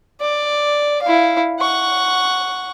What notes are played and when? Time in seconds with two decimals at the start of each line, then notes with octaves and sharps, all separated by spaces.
0.21 D5
1.03 E4 F5
1.60 F#5 C#6